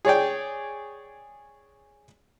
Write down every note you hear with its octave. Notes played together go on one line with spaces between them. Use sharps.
G#4 C#5 D5 G5